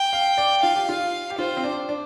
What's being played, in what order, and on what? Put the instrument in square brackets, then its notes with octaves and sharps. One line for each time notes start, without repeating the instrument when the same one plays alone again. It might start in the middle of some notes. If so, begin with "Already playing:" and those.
Already playing: [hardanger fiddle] G5
[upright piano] F5
D5
[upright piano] F4 [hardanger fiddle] F5
[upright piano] G4
F4
G4
[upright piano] F4 [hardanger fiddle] C5
[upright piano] C4
D4
D4